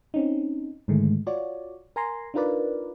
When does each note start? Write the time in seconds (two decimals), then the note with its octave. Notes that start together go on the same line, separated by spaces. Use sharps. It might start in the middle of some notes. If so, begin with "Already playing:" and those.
0.14 C4 C#4 D#4
0.88 G#2 D3 D#3 G#3 A3
1.27 F4 F#4 C#5 D5
1.96 A#4 G#5 A#5 C6
2.34 D4 D#4 F4 A#4 B4 D5